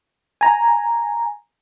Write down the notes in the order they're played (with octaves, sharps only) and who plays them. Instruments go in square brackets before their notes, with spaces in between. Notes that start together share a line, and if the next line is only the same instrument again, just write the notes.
[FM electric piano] G#5 A#5